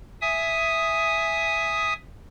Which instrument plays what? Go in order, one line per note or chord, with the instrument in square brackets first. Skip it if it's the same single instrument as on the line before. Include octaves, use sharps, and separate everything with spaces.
[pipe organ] E5 G#5 D#6